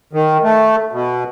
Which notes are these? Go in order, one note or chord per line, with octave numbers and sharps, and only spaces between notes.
D#3
A3
B2